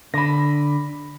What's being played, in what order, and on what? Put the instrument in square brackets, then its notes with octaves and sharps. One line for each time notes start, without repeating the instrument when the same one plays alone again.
[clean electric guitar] D3 [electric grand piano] B5 A#6